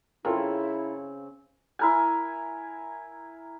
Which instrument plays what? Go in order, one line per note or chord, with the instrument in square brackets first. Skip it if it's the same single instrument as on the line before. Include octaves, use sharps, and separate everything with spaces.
[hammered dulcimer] C#3 C4 [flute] E4 [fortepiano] F4 A4 A#4
[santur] E4 A#4 G#5